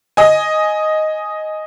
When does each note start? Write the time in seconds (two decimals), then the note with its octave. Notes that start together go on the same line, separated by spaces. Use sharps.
0.17 D#5 G#5